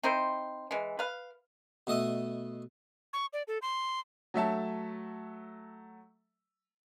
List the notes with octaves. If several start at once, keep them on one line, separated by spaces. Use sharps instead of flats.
C4 D#4 E4 C5
E3 G#3
B4 F5
B2 A3 D#5 E5 D#6
C#6
D5
A4
C6
F#3 A3 E5 A5